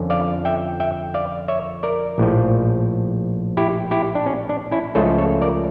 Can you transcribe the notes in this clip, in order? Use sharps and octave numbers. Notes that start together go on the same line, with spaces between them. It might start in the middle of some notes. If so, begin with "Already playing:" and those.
Already playing: F2 D3 F3 C#4
D5 F5
E5 G5
E5 G5
D5 F5
C#5 E5
A#4 D5
A#1 A2 F3
E4 G4
E4 G4
D4
C#4
D4
C#4 E4
C#2 C#3 F3 A3 C#4 F4 A4
A4 C#5
A#4 D5